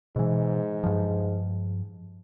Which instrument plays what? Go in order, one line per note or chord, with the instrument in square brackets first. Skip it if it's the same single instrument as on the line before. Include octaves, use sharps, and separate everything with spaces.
[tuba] G#2 [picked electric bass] B2 E3
[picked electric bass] G2 F3